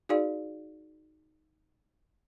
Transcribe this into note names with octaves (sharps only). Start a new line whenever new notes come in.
D#4 F#4 G#4 D5 F5